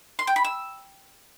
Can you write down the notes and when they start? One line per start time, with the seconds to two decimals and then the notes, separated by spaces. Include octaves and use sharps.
0.19 C6
0.27 G5
0.36 B5
0.44 E6